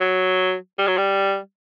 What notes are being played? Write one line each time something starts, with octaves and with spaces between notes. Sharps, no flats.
F#3
G3
F#3
G3